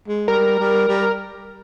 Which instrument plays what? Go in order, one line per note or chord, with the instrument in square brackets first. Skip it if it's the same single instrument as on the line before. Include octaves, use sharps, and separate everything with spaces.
[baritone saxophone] G#3
[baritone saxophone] G3 [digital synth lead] A#4
[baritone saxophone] G3
G3